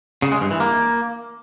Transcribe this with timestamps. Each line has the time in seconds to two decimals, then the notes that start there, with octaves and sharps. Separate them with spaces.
0.22 C#3
0.32 G#3
0.41 G2
0.51 E3
0.60 A#3